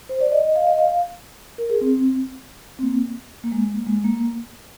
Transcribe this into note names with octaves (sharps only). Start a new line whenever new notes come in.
C5
D5
D#5
D#5
F5
D#5
F5
A#4
G#4
C4
C4
A#3
A#3
G#3
A#3
G#3
A#3